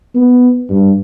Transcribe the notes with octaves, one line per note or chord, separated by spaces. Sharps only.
B3
G2